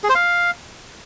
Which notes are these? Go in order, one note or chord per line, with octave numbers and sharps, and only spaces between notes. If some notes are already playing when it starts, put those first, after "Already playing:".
G#4
C5
F5